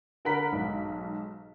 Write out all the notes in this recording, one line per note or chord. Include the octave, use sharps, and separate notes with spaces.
D3 A#4 F#5 B5 B6
B1 G#2